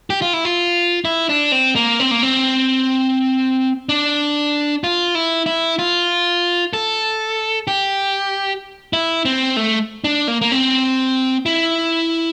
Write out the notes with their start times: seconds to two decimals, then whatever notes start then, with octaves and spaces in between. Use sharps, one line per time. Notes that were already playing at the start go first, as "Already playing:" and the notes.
0.10 G4
0.22 F4
0.33 E4
0.45 F4
1.05 E4
1.29 D4
1.52 C4
1.76 A#3
2.00 C4
2.11 A#3
2.23 C4
3.89 D4
4.84 F4
5.15 E4
5.46 E4
5.79 F4
6.73 A4
7.67 G4
8.93 E4
9.25 C4
9.57 A3
10.04 D4
10.28 A#3
10.41 A#3
10.52 C4
11.46 E4